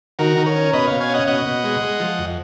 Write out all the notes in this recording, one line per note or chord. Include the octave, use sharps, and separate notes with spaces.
D#3 F#4 A#4
D#3
A#4 C#5
C#4
B2 B4 D#5
B2 C#5 F5
F5 G#5
C#4 D#5 F#5
B2 D#5 F#5
B2
G#3
G#3
F3
F2